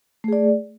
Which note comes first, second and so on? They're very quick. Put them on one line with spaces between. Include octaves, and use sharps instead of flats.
A3 G#4 D5